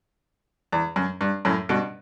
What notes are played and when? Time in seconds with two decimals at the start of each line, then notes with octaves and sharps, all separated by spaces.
0.72 E2
0.96 F#2
1.21 G2
1.45 F#2 A2
1.69 G2 B2